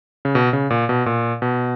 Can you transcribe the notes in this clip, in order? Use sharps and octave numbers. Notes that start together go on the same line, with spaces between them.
C#3
B2
C#3
A#2
B2
A#2
B2